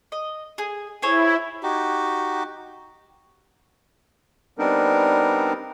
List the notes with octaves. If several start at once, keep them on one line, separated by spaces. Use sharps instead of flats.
D#5
G#4
E4 G#4 C5 C#5
D#4 F#4 G4
G3 B3 C4 D4 D#4 A#4